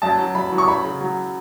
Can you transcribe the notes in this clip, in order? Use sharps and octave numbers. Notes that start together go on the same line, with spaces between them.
F#2 A5
F#3
F#2 B5
F#3
C#6
F#2 B5
C#3
F#3